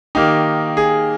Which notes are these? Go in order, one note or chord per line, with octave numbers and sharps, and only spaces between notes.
D#3 A#3 D#4 G4
G#4